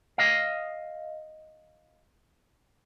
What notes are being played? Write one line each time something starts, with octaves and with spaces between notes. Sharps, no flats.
D#5 F5